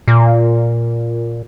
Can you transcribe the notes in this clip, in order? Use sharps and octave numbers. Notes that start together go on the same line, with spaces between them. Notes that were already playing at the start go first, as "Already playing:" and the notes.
A#2